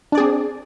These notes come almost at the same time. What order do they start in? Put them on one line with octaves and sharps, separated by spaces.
D4 D5 G#4 C4